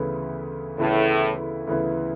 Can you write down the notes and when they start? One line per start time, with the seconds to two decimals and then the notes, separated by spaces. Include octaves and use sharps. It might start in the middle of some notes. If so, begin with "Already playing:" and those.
Already playing: D2 C#3 E3 B3 E4
0.78 D2 A2 C#3 E3 B3 E4
1.67 D2 C#3 E3 B3 E4